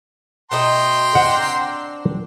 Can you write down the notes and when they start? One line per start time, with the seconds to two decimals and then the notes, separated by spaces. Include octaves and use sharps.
0.51 B2 A3 D#5 G5 A#5 C6
1.15 C4 D4 F#5